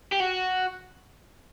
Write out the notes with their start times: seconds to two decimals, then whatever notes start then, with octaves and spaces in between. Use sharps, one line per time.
0.12 G4
0.20 F#4